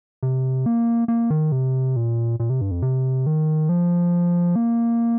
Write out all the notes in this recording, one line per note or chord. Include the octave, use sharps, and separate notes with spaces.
C3
A#3
A#3
D#3
C3
A#2
A#2
C3
G2
F2
C3
D#3
F3
A#3